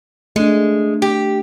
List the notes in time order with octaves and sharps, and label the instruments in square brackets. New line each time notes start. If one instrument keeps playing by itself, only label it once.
[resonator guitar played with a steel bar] G#3 [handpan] A3 D4
[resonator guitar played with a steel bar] G4